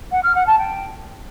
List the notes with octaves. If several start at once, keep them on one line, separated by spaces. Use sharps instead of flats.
F#5
F6
F#5
A5
G5